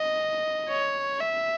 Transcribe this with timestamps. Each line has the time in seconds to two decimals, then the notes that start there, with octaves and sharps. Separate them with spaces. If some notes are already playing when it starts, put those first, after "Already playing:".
Already playing: D#5
0.69 C#5
1.20 E5